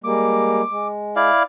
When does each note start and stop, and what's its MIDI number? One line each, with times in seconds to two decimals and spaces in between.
0.04 0.62 55
0.04 0.62 56
0.04 0.62 58
0.04 0.88 86
0.71 1.30 56
1.16 1.43 64
1.16 1.43 74
1.16 1.43 77